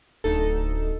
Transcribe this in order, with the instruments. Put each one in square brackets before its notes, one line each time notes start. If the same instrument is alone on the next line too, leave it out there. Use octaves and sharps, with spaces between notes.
[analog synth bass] D1 [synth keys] D2 D#4 A4